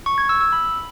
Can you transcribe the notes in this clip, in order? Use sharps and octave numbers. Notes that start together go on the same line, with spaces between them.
C#6
G#6
E6
E6
B5